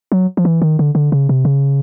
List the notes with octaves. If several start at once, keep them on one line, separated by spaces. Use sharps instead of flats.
F#3
F3
E3
D#3
D3
D3
C#3
C3
C#3